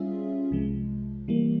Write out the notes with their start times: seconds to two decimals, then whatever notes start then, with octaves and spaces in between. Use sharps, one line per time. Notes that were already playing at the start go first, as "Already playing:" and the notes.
Already playing: G3 C#4 F4 G#4 E5
0.51 C2 C3 F3 G#3
1.28 E3 G3 A#3